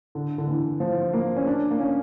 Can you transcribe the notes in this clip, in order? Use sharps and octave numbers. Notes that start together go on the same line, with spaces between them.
D3
D3
E3
F3
A#3
C#4
D4
A#3
C#4